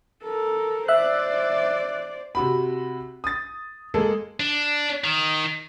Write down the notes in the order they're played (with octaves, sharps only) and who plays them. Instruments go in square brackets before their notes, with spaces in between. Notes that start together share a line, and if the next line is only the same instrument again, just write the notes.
[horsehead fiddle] A4 A#4
[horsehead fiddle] C5 D5 [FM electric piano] E5 F#6
[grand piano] C3 F#4 B5
D#6 A6
G#3 A#3 G#4 A4
[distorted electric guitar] D4
D#3